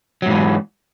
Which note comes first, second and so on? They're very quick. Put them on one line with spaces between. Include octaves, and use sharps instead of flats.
F#3 G#2 E3